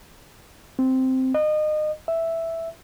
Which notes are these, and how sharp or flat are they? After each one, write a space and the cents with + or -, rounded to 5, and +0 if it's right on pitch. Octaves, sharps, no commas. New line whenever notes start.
C4 -5
D#5 -30
E5 +0